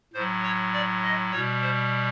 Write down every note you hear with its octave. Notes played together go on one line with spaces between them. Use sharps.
A2 F#3 C5
C#5
D5
D#5
B2 G3 C#5
C5